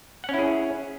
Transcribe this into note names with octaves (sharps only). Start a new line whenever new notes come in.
C#4 E4 G#4 F#5